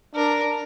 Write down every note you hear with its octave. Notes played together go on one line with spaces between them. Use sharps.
D4 A#4